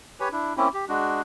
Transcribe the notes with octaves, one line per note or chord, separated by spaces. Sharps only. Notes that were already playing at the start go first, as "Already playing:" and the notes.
G4 B4 C#5 G#5
D4 E4
A#3 C4 C#4 E4
G4
G#3 D4 F#4